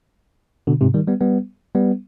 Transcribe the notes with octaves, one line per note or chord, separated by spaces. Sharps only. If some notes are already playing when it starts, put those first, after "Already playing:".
B2 D3
G#2 C3
D#3 G3
G3 B3
G3 B3
G3 B3